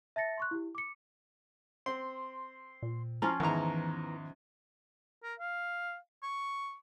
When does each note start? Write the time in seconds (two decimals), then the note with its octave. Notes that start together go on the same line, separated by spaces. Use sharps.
0.16 E5 A5 A6 A#6 C#7
0.38 C6 C#6 F#6
0.51 E4 G4
0.75 D6 C#7
1.86 C4 C6
2.83 A#2
3.22 F3 C#4 E4 F4 A#5
3.40 E2 G#2 D#3 E3 B3 A#5
5.23 A#4
5.39 F5
6.23 C#6